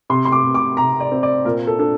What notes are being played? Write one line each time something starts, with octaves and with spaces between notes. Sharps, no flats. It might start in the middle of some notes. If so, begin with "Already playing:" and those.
C3 C6
C6
D6
C3
D6
C3 A#5
D5
C4
D5
A#2 A#4
A4
D4 A4